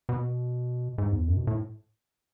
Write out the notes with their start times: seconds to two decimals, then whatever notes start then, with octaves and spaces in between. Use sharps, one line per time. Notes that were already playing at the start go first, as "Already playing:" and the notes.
0.09 B2
0.98 G#2
1.12 E2
1.28 F#2
1.37 B2
1.47 A2